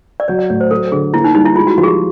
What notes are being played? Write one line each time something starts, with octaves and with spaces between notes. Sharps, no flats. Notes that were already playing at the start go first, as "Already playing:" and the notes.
D5
F#3 C#5
D5
A2 C#5
C5
F#3 A4
D3 G#4
A#3 E4
D#4
G3 D#4
E4
G#3 F4
F#4
F3 F#4
G#4
G4